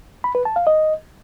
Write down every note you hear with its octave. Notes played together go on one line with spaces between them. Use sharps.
B5
B4
A5
F5
D#5